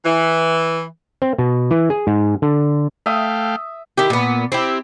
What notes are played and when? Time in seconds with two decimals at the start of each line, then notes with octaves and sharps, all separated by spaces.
0.05 E3
1.22 C4
1.38 B2
1.71 E3
1.90 G#4
2.07 G#2
2.42 D3
3.06 A3 E5 F5 G5 D#6
3.98 D#3 E4 G4
4.10 A#2 B3
4.52 C4 E4 G4